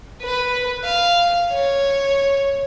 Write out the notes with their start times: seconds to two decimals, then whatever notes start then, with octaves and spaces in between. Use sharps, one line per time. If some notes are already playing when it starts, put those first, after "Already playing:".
0.22 B4
0.84 F5
1.52 C#5